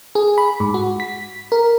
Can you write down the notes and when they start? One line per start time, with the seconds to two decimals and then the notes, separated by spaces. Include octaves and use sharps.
0.15 G#4
0.38 B5
0.60 G#2
0.74 F#4
1.00 B6
1.52 A#4